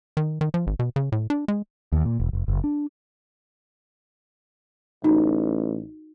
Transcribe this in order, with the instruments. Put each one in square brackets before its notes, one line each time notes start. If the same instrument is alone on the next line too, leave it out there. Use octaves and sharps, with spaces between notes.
[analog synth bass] D#3
D#3
F3
G#1
B2
C#3
A2
D4
G#3
[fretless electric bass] D#2
A#2
E1
F1
F#1
D4
[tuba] A1 [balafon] D#4 F#4